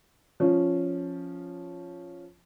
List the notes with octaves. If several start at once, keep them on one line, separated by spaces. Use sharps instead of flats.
F3 C#4